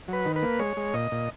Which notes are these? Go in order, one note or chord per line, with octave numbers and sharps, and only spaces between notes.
F#3 B4
D#3
B4
A#3
G#3 C#5
G#3
A#2 D#5
A#2